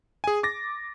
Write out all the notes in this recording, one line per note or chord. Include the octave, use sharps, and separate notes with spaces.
G#4 G#5
D6 A6 A#6